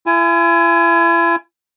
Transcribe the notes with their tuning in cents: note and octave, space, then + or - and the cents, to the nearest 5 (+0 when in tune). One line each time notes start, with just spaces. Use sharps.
E4 +40 G#5 +0